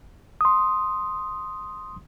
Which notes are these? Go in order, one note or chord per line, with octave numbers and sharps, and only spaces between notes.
C6 D#6